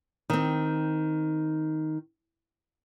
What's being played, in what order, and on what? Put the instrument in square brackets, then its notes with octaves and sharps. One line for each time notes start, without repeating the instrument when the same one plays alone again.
[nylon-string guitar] D#3 C4